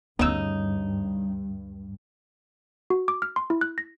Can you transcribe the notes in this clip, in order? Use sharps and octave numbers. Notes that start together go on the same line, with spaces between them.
D2 G2 C#3 G3 B3 D#4 E6
F#4
D6
F6
C6
E4
F#6
A#6